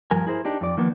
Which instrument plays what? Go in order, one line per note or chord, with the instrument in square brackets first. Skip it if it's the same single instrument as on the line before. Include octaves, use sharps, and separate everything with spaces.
[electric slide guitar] G2 F3 A#4 G#5
E4 G#4 A#4 C5
D4 D#4 G4
F2 D5
D#3 F3 A#3 B3